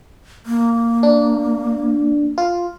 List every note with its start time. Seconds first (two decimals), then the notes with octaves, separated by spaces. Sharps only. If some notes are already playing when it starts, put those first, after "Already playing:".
0.46 A#3
1.03 D4
2.38 F4